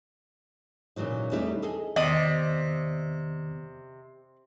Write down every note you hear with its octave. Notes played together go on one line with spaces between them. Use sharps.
A#2 C#3 E3 F#3 D#4
E2 F#3 G3 A3 D#4 E4
G#4 A4 D#5 G#5
E2 C3 D#3 B3 D5 D#5